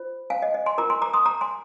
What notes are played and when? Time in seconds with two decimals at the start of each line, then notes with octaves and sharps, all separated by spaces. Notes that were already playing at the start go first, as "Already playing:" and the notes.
Already playing: F4 C5
0.30 F5 G#5
0.42 D#5
0.54 D#5
0.66 G#5 C6
0.78 F4 A#4 A#5 D6
0.90 G#5 C6
1.02 A#5 D6
1.13 C6 D#6
1.26 A#5 D6
1.41 G#5 C6